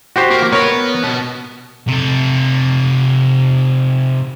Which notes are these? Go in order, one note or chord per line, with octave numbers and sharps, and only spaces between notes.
F#4 G4 C5
A#3
B3 A#4 B4 C#5
B2 A5
C3 A4